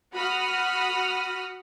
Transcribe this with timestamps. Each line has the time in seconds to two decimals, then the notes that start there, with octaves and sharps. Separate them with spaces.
0.14 F#4 F#5 B5 D#6 F6